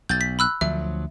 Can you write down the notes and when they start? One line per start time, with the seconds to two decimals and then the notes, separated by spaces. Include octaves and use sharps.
0.09 B1 G6 A6
0.21 B6
0.39 B5 E6 F#6
0.61 D2 F3 F#3 E5